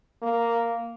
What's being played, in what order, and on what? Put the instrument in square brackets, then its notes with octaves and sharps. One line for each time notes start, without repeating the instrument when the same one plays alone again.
[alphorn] A#3